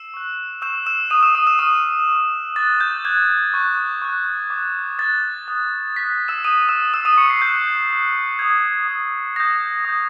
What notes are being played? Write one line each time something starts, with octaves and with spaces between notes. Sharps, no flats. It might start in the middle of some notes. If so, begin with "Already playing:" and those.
Already playing: E6 E7
C#6 F#6
C#6 E6 G6 E7
E6 E7
C#6 D#6 E6 G6 D#7
E6 E7
D#6 D#7
E6 E7
C#6 D#6 F6 D#7
C#6 F6
D6 F#6 A6
G6
D6 F#6 G#6
C#6 F#6
C#6 F#6
D6 F#6
D6 F#6 A6
D#6 F#6
D#6 F#6 B6
E6 E7
D#6 G6 D#7
E6 E7
D#6 E6 G6 E7
D#6 D#7
C#6 C#7
C7
D#6 F#6 G6
D#6 F#6
D#6 G6 G#6
D#6 G6
D#6 G6 A#6
D#6 G6